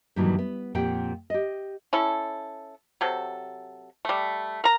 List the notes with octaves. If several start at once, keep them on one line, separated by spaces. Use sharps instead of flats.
G2 A#2 D#3 E3 F#3
B3
F2 A#2 C4 G4 F#5 G5
G4 D#5
C#4 E4 A4
C3 F#3 A4
G3 A3
A#4 A#5